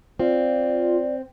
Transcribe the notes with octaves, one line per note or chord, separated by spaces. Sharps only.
C4 F4 D5